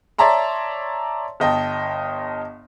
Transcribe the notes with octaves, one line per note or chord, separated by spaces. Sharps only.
C#5 D5 E5 A5 A#5 C6
G1 D#5 G5 A5